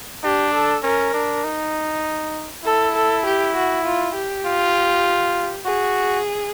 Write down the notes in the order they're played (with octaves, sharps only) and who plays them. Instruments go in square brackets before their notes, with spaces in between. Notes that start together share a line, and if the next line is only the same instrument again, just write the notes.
[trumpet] D4 [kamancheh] G4
[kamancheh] A4
[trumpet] C#4 [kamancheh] A#4
[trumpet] D4
D#4
[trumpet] E4 [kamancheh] A4
[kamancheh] A4
G4
F#4
F4
G4
[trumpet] F4
[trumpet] F#4 [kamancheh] G#4